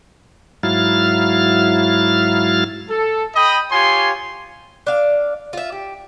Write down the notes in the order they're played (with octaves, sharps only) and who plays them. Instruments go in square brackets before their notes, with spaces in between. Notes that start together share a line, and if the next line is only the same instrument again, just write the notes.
[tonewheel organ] G#2 F#3 E4 F5 F6 A6
[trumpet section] A4
D#5 G5 B5 D#6
F4 G4 C#5 G#5 C6
[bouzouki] D4 F5
F4 E5
G4